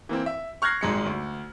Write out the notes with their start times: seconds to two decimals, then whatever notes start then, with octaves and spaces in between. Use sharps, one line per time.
0.09 E3 A#3 C4
0.26 E5
0.62 C#6 F6 F#6 G#6 A#6 C7
0.81 D#1 G#1 G#3 C#7
1.06 D2